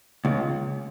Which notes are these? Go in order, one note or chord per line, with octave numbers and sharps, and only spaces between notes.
C#2